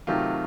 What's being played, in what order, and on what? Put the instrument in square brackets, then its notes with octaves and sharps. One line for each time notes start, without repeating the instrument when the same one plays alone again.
[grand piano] C3 D#3 F#3 A3 F4 G4